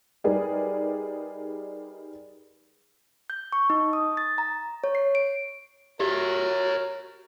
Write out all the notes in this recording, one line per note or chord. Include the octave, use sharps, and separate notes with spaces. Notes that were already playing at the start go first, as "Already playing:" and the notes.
G3 D#4 G#4 A#4 B4 D5
G6
C#6
D#4
D#6
A6
A#5
C#5
C7
D7
F#4 G4 A#4 C#5 E5